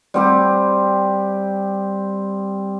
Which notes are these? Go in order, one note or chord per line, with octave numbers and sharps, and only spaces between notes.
G3 C4 G4